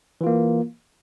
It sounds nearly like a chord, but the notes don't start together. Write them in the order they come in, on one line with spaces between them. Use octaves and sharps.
E3 F4 A#3